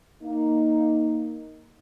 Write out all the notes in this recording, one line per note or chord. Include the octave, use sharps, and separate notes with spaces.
A#3 D#4